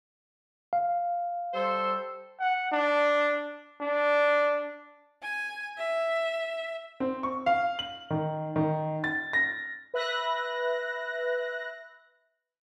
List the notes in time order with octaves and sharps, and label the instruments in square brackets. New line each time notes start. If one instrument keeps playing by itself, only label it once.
[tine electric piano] F5
[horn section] G3 A4 C5
[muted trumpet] F#5
D4
D4
[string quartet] G#5
E5
[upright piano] C4
C#6
F5
F#7
D#3
D#3
A6
A#6
[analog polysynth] B4 E5 F#6 A#6